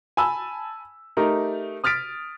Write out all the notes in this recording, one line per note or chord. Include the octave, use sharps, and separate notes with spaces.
G#5 A5 B5 E6
A3 D#4 G4 A#4
D#6 F6 A6 B6 D7